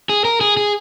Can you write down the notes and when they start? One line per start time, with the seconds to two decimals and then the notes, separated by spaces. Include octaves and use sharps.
0.09 G#4
0.25 A#4
0.41 G#4
0.57 G#4